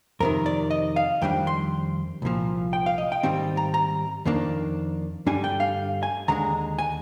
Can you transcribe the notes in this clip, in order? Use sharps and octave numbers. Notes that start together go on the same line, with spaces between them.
F2 C3 D#3 A#4
D5
D#5
F5
F2 D#3 G3 D4 G5
C6
C2 A#2 F3
G5
F5
D#5
G5
G#2 D#3 G3 C4 G5
A#5
A#5
F2 D#3 A#3 D4
G2 D3 G3 D4 G#5
G5
F5
G#5
D#2 D3 G#3 D4 A#5
G#5